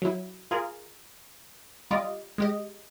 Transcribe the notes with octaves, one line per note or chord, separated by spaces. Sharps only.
F#3 E4
F4 G#4 A#4
G3 F4 D5 D#5
G#3 G4 D#5